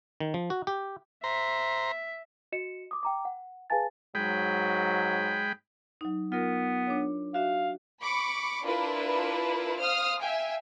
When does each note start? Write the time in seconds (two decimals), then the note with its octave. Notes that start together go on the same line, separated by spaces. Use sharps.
0.20 D#3
0.34 F3
0.50 F#4
0.67 G4
1.24 C5 E5 A#5
2.52 F#4 D#5 C#7 E7
2.91 D6 D#6
3.03 G5 A#5 D6
3.25 F#5
3.70 G#4 B4 F5 G#5 A5 A6
4.15 G#2 F#3 G#3 G5 B5
6.01 F#3 D#4
6.32 B3 F4 A#4
6.87 D4 C#5
7.34 F#4 E5 F5
8.02 B5 C#6 D6
8.64 D4 E4 F4 A#4 B4
9.79 C5 F5 D#6 F6
10.22 E5 F5 G5 G#5